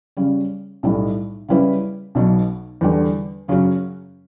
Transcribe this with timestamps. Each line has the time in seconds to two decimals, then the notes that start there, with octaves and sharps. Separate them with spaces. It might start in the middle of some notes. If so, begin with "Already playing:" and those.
0.17 C#3 G3 C#4
0.83 B1 A2 G3
1.49 C#3 G3 C#4 E4 B4
2.15 B1 B2 F#3
2.81 E2 D3 G3
3.48 F#2 C#3 F#3 C#4 F#4